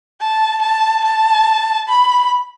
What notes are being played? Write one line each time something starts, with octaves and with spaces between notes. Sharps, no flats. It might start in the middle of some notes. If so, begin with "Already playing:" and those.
A5
A5
A5
B5